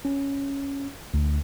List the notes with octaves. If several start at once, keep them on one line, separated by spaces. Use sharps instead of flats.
C#4
D2